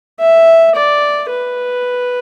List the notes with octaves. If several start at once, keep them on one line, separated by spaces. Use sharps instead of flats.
E5
D5
B4